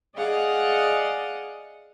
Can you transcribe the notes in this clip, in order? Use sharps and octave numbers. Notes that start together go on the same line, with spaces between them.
G#4 D5 D#5 F5 F#5